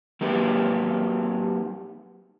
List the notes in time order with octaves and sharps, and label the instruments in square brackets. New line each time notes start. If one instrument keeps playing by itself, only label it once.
[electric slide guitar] F#3 A#3 D#4 G4 B4